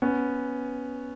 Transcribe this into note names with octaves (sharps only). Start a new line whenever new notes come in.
B3 C#4